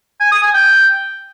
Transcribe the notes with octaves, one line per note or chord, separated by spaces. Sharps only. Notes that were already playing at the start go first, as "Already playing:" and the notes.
G#5
D#6
G#5
G5